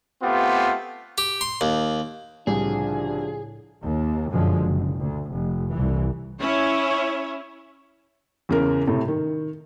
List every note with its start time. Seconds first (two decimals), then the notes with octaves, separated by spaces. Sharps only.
0.23 A3 B3 C4 F4 G4
1.18 G4
1.41 C6
1.61 D#2
2.47 C2 A2 C#3 F3 D4 G#4
3.84 D#2
4.30 F#2 B2 D3 F3 G#3
4.60 F#1
4.98 D2
5.30 F1
5.72 C2 E3
6.40 C#4 E4 C#5
8.49 E2 C#3 A#4
8.87 A2 C3 A3
9.08 D#3